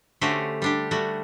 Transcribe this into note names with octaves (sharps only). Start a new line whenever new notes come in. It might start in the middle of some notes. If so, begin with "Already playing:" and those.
D3 A3 C#4 F#4 G4 C5
G3 D4 G4
G3 A3 F#4